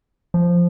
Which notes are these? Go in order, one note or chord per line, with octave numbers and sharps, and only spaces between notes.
F3